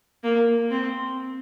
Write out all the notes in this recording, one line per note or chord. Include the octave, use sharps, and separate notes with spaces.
A#3
C4